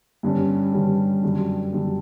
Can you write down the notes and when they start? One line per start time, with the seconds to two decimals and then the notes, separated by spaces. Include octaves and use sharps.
0.23 G2 D3 G3 C#4
0.73 G2 D3 G3 C#4
1.24 F#2 D3 G3
1.73 F#2 D3 G3